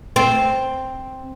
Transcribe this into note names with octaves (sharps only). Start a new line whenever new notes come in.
C4